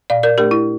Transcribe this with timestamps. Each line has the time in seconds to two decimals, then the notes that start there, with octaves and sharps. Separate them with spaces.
0.10 A#2 D5 F5
0.23 A#4 D5
0.38 A3 D4 G4 A#4
0.51 E4